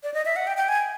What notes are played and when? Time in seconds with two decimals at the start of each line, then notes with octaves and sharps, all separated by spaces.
0.03 D5
0.14 D#5
0.25 E5
0.36 F#5
0.47 G5
0.57 G5
0.68 G#5